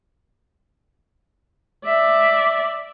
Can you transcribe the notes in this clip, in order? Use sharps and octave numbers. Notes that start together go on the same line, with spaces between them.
D5 E5